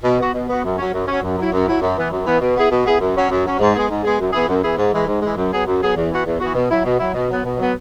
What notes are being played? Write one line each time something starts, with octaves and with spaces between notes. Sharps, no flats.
B2
B3 F#4
B2
B3 F#4
F#2
F#3 C#4
F#2
F#3 C#4
F#2
F#3 E4
F#2
F#3 E4
F#2
E3 B3
F#2
E3 B3
B2
B3 E4 G#4
B2
B3 E4 G#4
F#2
F#3 C#4
F#2
F#3 C#4
G#2
G#3 B3 G#4
G#2
G#3 B3 G#4
F#2
E3 B3 E4 G#4
F#2
E3 B3 E4 G#4
G#2
E3 G#3
G#2
E3 G#3
F#2
F#3 B3 G#4
F#2
F#3 B3 G#4
E2
E3 B3 F#4
E2
E3 B3 F#4
B2
F#3 E4
B2
F#3 E4
B2
F#3 B3
B2
F#3 B3